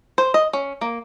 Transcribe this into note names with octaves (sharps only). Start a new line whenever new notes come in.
C5
D#5
C#4
A#3